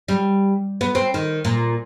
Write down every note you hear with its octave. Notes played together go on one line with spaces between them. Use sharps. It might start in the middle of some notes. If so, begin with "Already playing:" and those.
G3
B3
C4
D#3
A#2